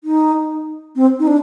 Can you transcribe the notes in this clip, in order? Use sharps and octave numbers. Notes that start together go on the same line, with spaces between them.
D#4
C4
D#4
D4